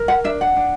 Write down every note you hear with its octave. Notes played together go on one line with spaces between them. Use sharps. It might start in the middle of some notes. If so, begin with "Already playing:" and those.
Already playing: A#4
F#5
D4 E5
F#5
D4